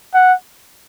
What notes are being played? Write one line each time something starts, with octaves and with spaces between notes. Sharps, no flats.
F#5